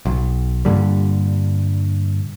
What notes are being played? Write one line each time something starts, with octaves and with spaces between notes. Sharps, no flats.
B1
G2 A#2 D3 G3